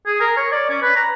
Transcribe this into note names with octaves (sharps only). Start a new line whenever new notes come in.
G#4
A#4
C#5
D5
C#4
B4
A#5